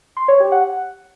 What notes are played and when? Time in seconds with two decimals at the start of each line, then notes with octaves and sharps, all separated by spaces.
0.17 C6
0.28 C#5
0.40 G4
0.52 F#5